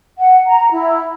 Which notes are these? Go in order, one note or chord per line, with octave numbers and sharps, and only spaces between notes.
F#5
A#5
E4